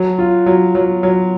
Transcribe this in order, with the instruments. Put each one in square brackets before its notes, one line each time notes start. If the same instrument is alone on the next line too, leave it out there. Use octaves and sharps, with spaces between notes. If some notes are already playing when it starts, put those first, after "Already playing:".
Already playing: [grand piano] F#3
F4
F#3
F#3
F#3